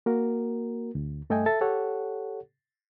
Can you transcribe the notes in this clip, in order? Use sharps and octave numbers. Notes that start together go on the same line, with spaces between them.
A#3 F#4 A#4
D2
G2 A3 A4 D#5 G5 G#5
A4 E5 A5 A6
G4 A4 C#5 F#5